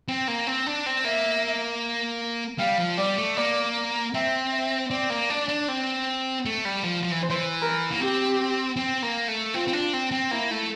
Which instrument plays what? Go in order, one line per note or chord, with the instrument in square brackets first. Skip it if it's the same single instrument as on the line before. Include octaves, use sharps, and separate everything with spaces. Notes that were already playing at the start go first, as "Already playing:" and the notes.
[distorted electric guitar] C4
A#3
C4
D4
C4
[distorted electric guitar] A#3 [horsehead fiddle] E5
[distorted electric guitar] G3 [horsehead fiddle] F5
[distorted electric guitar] F3
[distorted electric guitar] G3 [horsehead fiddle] D5
[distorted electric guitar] A3
[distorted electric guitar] A#3 [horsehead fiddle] D5
[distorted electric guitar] C4 [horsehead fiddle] E5
[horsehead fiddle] E5
[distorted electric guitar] C4 [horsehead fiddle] D5
[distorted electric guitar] A#3
D4
D4
C4
A3
G3
F3
F3
E3
[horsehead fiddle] C5
[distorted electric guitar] E3
[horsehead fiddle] A#4
[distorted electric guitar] A#3
[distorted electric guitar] C4 [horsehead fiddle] G4
[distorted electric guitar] C4
A#3
A3
[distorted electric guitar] C4 [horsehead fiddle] F4
[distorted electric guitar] C4
D4
C4
C4
[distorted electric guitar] A#3 [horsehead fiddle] E4
[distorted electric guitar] A3